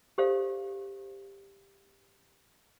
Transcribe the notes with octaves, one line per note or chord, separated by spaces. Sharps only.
G4 A4 C5 D5 F5